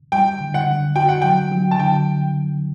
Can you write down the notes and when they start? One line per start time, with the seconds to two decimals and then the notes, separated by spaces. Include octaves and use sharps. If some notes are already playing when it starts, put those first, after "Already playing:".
0.12 G3 G5
0.40 D3
0.54 F#5
0.68 D3
0.96 F#4 G5
1.09 F#5
1.22 F#3 G5
1.52 F#3
1.71 A5
1.79 D3 G5